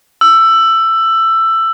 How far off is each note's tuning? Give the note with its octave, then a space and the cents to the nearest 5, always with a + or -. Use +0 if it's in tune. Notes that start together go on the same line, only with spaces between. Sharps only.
E6 +15